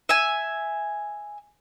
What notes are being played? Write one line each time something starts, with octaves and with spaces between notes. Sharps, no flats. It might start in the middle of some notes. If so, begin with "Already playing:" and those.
E5 G#5